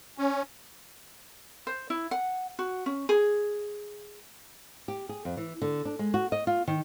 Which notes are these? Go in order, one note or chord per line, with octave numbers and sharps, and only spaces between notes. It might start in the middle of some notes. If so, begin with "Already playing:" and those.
C#4
C5
E4
F#5
F#4
C#4
G#4
G4
G#4
F2
E3
D3
D4
G#3
F#4
D#5
F4
D#3